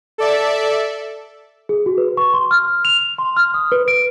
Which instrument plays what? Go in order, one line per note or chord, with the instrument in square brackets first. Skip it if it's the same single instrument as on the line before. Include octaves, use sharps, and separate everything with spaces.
[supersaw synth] A4 D5 E5
[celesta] G#4
F#4
B4
C#6
C6
F6
F7
C6
F6
D#6
B4
D7